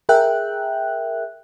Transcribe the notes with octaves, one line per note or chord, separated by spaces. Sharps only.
G#4 A#4 E5 G5 F#6